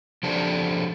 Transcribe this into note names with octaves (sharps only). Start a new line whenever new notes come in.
F3 D4 G4 A4 C5 D5